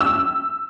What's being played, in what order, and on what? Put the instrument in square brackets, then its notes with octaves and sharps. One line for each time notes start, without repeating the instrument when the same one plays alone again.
[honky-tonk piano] E6